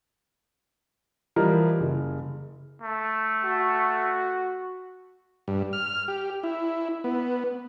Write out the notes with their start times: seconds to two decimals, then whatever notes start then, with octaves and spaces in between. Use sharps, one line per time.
1.36 E3 F3 G3 A#4 D#5
1.80 F#1
2.82 A3
3.45 F#4
5.48 G2
5.73 F6
6.08 G4
6.43 E4
7.04 B3